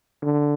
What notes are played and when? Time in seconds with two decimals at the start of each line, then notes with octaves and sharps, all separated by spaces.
0.22 D3